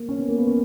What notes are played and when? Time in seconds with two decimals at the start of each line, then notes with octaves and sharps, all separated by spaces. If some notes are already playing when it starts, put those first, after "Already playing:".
Already playing: A#3
0.09 C#4
0.19 B3
0.28 A#3
0.38 B3
0.47 C#4